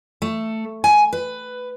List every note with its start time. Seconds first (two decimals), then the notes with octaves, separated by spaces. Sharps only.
0.22 A3
0.84 G#5
1.13 B4